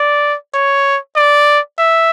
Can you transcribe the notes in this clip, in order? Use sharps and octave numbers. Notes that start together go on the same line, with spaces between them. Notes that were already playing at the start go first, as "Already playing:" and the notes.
Already playing: D5
C#5
D5
E5